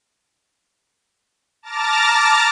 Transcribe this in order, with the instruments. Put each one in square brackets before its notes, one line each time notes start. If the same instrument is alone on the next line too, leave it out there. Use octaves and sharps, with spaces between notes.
[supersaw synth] A5 A#5 D6 F6 A6 A#6